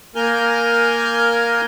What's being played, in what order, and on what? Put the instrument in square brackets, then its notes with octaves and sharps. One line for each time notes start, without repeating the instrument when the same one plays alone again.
[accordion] A#3 A#4 G#5 F6 G6